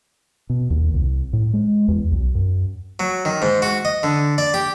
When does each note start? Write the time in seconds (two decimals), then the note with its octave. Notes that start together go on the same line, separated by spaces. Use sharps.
0.50 B2
0.70 D#2
0.94 C2
1.33 A2
1.53 G#3
1.88 E2
2.12 B1
2.35 F#2
3.00 F#3
3.25 D#3
3.42 G#2
3.62 F#4
3.85 D#5
4.03 D3
4.38 D5
4.54 G4